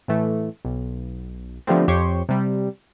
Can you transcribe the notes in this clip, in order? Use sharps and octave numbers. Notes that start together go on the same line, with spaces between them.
A2 E3 A3
B1
D3 F3 G3 A3 B3 C4
F2 G4 C5 C#5 C6 C#6
C3 G3